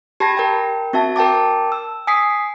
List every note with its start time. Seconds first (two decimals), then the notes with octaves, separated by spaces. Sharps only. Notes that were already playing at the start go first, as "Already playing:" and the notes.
0.20 G4 A5 B5 G#6 A#6
0.37 A#4 G5
0.93 C4 F#4 E5 A5
1.16 A#4 G5 A5 D6
1.72 E6
2.07 G#5 D#6 B6 C7